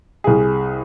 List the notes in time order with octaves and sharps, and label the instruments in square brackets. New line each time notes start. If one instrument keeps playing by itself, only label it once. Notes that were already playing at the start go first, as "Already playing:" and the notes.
[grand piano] C2 G#4